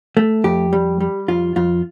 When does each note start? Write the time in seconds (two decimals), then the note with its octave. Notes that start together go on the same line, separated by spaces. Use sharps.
0.17 A3
0.44 F2 G4
0.73 G3
1.00 G3
1.28 F2 F4
1.56 F2 F4